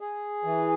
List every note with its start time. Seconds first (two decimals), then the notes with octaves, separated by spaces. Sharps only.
0.01 G#4
0.44 E3